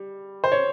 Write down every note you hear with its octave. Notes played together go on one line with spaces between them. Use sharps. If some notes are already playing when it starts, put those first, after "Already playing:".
Already playing: G3
C5
C#5